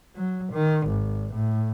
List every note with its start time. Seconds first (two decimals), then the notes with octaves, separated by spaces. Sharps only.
0.15 F#3
0.52 D#3
0.87 G#1
1.34 A2